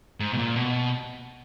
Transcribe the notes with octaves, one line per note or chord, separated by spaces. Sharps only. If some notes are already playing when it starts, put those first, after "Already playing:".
G#2
B2
A#2
B2